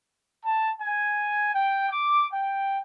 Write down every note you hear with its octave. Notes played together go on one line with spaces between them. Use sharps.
A5
G#5
G5
D6
G5